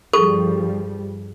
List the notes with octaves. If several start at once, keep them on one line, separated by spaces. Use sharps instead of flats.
G2 F3 G3 G#4 A4 C#6